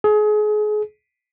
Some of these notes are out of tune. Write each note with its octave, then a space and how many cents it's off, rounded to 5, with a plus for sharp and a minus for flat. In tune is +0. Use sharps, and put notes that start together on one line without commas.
G#4 +30